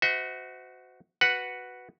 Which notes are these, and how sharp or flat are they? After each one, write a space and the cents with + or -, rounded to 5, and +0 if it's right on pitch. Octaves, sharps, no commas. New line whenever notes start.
F#4 +0 C5 -40 E5 -40
F#4 +0 B4 +0 F#5 +0